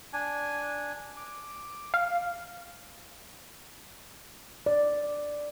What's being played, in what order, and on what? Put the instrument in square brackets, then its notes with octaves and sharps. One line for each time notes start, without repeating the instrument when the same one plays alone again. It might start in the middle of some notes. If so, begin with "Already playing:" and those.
[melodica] D4 G#5
D6
[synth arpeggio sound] F5
[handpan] D5